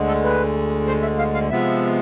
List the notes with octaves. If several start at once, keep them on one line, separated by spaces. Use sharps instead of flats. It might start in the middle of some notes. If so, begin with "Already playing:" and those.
Already playing: D2 D3 G#3
A4
B4
C5
E5
F5
F5
C3 F3 G#3 B3 E5